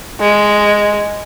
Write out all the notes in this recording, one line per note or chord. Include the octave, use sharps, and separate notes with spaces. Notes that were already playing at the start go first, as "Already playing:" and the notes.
G#3